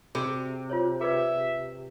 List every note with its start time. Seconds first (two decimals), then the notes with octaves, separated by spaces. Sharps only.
0.15 C3 F#4 G#4 D5
0.70 F4 C5 C#5
1.01 G#4 B4 D5 E5